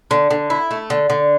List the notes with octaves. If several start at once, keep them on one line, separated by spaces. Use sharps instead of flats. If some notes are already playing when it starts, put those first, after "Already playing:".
D3
D3
E4
A3
D3
D3